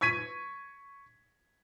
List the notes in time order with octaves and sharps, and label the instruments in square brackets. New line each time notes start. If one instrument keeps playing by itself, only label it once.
[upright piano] C#6 G#6 B6 D#7